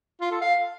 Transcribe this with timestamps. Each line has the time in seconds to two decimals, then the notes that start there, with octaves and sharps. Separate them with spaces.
0.21 F4
0.31 A4
0.42 F5